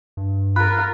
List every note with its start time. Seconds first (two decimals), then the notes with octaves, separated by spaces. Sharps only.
0.17 G2
0.56 F4 A#4 B5 F#6